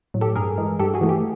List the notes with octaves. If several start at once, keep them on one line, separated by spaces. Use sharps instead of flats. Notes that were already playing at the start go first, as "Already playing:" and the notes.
A2 F#3
G4 A4
G2 G#4 A#4
E3 G#3
G2 G4 A4
F#4 G#4
E3 A3
G4